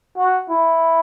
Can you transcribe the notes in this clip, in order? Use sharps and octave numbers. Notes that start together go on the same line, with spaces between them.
F#4
E4